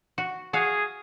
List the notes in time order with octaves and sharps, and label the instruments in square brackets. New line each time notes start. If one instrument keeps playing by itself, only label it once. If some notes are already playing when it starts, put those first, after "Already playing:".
[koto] F#4
[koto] F#4 F5 [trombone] G#4